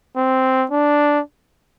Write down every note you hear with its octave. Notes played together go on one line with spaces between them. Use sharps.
C4
D4